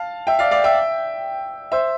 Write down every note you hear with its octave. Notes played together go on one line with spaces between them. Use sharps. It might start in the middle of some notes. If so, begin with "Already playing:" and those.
Already playing: F5 A5
E5 G5
D5 F5
D5 F5
E5 G5
C5 E5